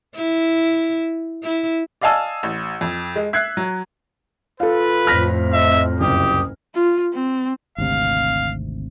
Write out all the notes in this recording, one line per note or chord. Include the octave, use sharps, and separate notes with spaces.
E4
E4
D5 D#5 F5 G#5 A5 E6
A1
F2
G#3
E5 F#6 G#6 C7
F#3
F4 A4 B4 F5
F2 A2 F6 A#6 B6
D#5 E5
F#1 C2 G4 D#6
F4
C4
G#1 D2 C3 F5